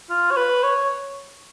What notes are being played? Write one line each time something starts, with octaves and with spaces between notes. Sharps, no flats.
F4
C#5
B4
C#5